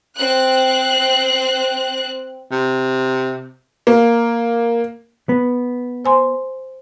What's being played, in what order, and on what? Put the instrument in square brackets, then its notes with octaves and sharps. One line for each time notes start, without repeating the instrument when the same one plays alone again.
[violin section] C4 F#6
[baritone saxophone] C3
[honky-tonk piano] A#3
[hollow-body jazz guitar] B3
[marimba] C5 G#5 C6